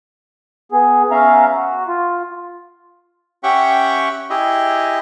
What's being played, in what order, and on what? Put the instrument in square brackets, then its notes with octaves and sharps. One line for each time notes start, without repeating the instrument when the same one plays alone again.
[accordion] B3 G#4
B3 C#4 E5 F5 A#5
F#4
F4
[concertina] C#4 G4 E5 F#5 G5 C#6
E4 G4 G#4 D#5